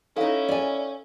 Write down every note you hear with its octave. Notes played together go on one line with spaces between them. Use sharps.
C#4 D#4 E4 A4 F5
D5 G#5